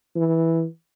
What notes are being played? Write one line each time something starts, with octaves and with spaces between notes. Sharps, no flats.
E3